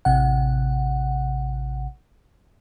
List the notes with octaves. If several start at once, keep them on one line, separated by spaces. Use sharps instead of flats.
A1 C3 F#5